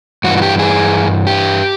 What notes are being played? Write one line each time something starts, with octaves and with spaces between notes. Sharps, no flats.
G2 E3 F#4
F#4
G4
G#4
G4